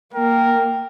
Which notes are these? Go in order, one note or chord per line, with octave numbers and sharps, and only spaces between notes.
A#3 A#4 G5